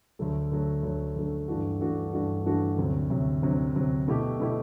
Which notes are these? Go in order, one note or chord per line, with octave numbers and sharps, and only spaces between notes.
D2 D3 F#3 A3
D2 D3 F#3 A3
D2 D3 F#3 A3
D2 D3 F#3 A3
G2 E3 A3 D4 F#4
G2 E3 A3 D4 F#4
G2 E3 A3 D4 F#4
G2 E3 A3 D4 F#4
D2 C3 F#3
D2 C3 F#3
D2 C3 F#3
D2 C3 F#3
B2 A3 E4 G4
B2 A3 E4 G4